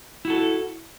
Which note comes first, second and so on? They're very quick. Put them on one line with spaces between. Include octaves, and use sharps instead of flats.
E4 F#4 A4